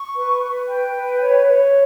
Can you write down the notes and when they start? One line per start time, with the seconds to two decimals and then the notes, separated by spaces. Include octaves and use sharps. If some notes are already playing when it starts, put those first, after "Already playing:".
Already playing: C#6
0.15 B4
0.41 B4
0.67 G5
0.94 B4
1.19 C#5
1.46 C#5